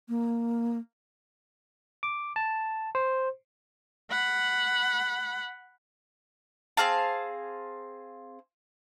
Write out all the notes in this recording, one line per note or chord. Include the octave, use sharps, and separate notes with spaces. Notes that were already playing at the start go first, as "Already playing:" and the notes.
A#3
D6
A5
C5
F#5 B5
C4 G#4 F5 A5